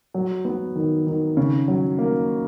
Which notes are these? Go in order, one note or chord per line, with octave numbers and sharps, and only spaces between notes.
F#3
B3
D#3
D#3
C#3
F#3
A#3